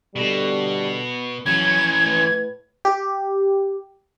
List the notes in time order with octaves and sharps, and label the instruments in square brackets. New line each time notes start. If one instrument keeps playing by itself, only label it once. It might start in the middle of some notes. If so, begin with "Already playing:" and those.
[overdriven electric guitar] B2 [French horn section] D3 G3 A4
[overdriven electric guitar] E3 C#4 [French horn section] F#3 C#5 [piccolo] G#6
[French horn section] A2 B4
[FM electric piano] G4